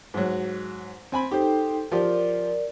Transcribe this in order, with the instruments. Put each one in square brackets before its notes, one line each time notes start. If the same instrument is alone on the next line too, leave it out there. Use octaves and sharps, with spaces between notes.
[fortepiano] G#2 F#3
C4 G#5 B5
[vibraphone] D#4 A4 G5 [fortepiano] G4 C5
[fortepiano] F3 F4 G4 [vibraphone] A#4 D5